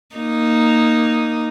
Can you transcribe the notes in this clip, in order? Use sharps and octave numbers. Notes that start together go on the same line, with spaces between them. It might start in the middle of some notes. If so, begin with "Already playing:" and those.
A#3 D#4